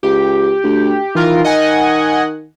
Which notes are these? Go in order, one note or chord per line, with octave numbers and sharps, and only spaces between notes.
C#2 G4
D2
D#3 E3 F4 A#4
D#5 F#5 G#5